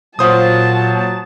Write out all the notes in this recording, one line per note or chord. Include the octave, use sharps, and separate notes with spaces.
A#2 F#3 F4 C5 A5 D#6